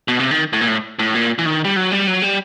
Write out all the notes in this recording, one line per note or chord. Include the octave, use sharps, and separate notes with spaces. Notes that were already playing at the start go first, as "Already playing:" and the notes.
B2
C3
D#3
A2
A#2
A2
A2
A#2
E3
D#3
G3
F#3
G3
F#3
G3